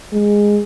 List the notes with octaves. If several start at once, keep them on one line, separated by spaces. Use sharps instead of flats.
G#3